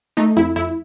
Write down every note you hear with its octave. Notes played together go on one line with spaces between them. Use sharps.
A3 D#4
F2 E4
F2 E4